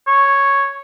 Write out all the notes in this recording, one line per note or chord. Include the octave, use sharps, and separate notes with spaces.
C#5